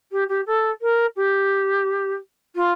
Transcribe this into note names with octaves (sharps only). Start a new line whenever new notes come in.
G4
G4
A4
A#4
G4
F4